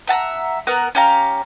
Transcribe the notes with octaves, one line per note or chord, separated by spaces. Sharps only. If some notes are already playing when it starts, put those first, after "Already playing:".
E5 F#5 A5 A#5
B3 A#4 F#5 F6
C#4 G4 F5 A#5